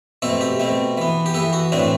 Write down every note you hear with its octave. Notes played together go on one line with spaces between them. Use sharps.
B2 A3 C4 A4
G4
B2 A3 C4
E3 B3
G4
E3 B3 A4
F#4
A2 E3 A3 C4 D4